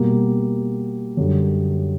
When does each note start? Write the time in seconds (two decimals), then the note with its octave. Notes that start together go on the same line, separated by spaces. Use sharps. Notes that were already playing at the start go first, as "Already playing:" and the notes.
Already playing: B2 G3 A#3
1.17 F#2 D3 G3